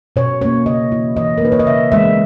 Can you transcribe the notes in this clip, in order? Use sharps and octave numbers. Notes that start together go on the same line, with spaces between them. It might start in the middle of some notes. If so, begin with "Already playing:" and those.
B2 C#5
A#3 C#4 C#5
C#3 D#5
E3 A#3 E4
E3 D#5
A#4
A#3 D#4 B4
C#5
D#5
C#3 E5
E3 G#3 B3 E5